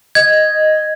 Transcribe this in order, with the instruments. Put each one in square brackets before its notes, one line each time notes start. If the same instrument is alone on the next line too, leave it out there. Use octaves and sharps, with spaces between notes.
[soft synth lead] D#5 [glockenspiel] G#6